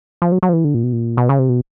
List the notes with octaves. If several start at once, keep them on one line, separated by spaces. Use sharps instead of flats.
F3
F#3
F#3
F3
E3
D3
A#2
B2
A#2
B2
C#3
C3
B2